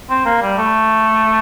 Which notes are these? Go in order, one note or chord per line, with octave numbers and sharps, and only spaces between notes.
C4
A#3
G3
A3